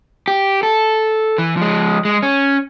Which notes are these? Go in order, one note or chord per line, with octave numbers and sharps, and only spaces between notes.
G4
A4
E3
F3 G#3
G#3
C#4